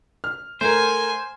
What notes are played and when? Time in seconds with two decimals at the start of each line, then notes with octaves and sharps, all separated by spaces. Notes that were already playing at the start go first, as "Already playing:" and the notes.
0.24 F6
0.61 A3 A#4 C5 G#5